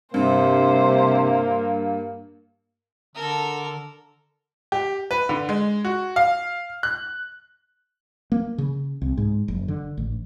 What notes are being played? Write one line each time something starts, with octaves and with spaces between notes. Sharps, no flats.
G2 C3 A#3 C5
D3 A4 A#4
G4
B4
D3
G#3
F#4
F5
F#6
A#3
C#3
C2
G#2
F#1
D3
A1